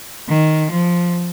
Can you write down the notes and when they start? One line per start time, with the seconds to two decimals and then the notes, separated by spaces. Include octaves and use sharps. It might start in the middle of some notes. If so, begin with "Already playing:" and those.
0.28 D#3
0.71 F3